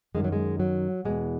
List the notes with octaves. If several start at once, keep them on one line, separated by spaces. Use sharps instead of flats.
F#2 D#3 G#3
F#3
G#3
F#3
E2 B2 G#3